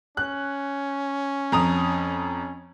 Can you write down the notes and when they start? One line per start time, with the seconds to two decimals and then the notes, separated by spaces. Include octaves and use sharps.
0.17 C#4 F#6
1.52 F2 A#5 D#6